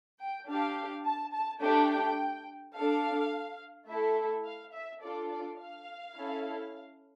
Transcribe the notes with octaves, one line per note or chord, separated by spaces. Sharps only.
G5
D4 G4 F5
A5
A5
A3 D4 G4 G5
D4 A4 F5
A3 E4 A4 E5
F5
E5
D4 F4 A4 D5
D5
F5
C#4 E4 A4